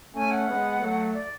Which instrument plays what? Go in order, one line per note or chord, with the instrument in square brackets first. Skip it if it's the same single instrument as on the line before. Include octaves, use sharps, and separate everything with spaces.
[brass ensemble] A3 C#4 [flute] G#5
[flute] F#5
[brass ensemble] G#3 B3
F#3 A3
[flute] D5